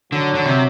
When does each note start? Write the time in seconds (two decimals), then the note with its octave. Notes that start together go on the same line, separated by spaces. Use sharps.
0.12 D3 F#3
0.35 D3
0.46 C3